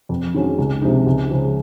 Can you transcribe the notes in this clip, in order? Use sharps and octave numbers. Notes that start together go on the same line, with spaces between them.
F2
D#3 G#3 C#4 F#4
C#2
C3 F3 G#3 D#4
C#2
C#3 F3